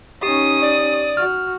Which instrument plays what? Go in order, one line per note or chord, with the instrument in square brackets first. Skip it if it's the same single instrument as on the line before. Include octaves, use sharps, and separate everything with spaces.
[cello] C#4 D#4 [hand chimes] G4 [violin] D#6
[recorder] D5
[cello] F#4 [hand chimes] F6